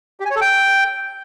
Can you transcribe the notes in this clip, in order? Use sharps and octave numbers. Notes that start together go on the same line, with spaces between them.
G4
G#5
C#5
A4
G5